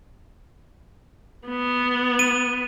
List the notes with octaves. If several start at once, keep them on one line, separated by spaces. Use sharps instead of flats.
B3
D#7